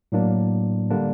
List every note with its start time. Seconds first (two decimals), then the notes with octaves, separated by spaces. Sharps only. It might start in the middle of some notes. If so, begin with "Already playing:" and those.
0.12 A2 F#3 A#3 D4
0.90 D3 G3 A#3 D4